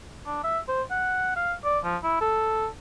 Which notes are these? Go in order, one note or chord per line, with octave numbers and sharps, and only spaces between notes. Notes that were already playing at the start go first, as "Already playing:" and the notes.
D4
E5
C5
F#5
F5
D5
F3
E4
A4